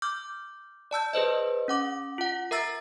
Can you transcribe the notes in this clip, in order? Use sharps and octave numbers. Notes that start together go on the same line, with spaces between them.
D6 F6 G6
D5 A5 E6 G6
G#4 B4 C5 D#5
C#4 F#5 D6
F4 F#5
A#4 E5 A#5 E6 A6